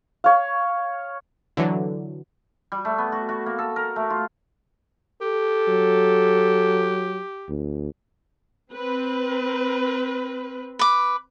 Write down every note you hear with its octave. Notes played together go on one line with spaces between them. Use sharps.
C#5 F5
D3 E3 F#3
G3
A3
B3
F#4
F#4
A#3
A4
A#4
A3
F4
G4 A4
F#3
D2
C4 B4
B4 D6